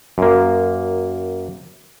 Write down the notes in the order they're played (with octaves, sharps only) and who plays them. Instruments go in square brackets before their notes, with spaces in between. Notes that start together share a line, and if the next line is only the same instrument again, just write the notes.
[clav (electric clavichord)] F#2 A#3